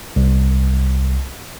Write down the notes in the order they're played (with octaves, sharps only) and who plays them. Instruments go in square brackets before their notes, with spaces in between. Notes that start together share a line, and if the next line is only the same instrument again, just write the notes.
[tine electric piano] C2